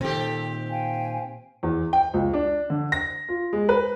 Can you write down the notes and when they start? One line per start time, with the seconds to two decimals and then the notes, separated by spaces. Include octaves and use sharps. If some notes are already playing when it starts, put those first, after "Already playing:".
0.01 A#2 D#3 C4 G4 A4
0.70 F5 G5 G#5
1.63 E2
1.93 G5
2.14 C#2
2.34 D4
2.70 D3
2.92 A#6
3.29 F4
3.53 G#3
3.69 B4